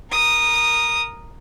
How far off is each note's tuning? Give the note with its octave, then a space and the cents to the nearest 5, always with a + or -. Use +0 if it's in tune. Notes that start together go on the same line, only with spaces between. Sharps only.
A#4 +5 D#6 -15